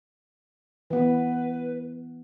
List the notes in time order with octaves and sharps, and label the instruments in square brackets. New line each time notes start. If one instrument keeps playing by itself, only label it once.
[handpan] E3 B3 [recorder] B4